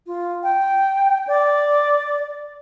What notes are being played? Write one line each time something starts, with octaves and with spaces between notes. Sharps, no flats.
F4
G5
D5